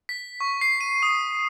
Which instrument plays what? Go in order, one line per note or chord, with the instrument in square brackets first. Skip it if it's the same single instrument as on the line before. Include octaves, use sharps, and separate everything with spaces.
[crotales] B6
C#6
C7
D#7
D#6